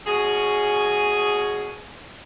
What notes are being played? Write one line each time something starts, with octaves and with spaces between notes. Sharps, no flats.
B2 C#4 G#4